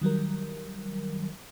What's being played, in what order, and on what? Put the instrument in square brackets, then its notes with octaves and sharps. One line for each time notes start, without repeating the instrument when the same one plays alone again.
[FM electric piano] D#3 F#3 G3 A#4